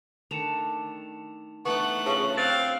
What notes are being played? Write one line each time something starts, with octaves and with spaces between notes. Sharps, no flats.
D#3 A3 D4 C#7 E7 F7
E3 A3 B3 D4 D#4 C#6 F#6
C#3 F4 D5 A5 C6 C#6
C4 F5 F#6 A6